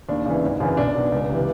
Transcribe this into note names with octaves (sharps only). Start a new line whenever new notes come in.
D#2 D4
C#3 E3
G#1
F#2 C#3 E3
B1 D4
B2
C#2
C3 E3